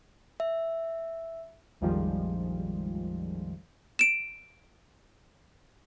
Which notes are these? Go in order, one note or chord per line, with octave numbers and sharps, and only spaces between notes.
E5
A#1 F2 D#3 F3 G3 G#3
D7 E7